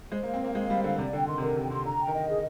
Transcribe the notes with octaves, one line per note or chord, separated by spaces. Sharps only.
G#3 C5
A#3
F5
C4
A#3 C5
G#3 F5
G3 C5
D3 F5
C3 D5
D3 G5
D#3 C6
C3
D3 A#4
C3 G5
C3 C6
D3 A#5
G5
D#3
D#5
G#4